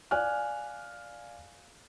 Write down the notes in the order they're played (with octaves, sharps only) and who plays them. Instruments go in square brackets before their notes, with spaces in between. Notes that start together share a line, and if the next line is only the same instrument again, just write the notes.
[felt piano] D5 F5 G#5 F6 F#6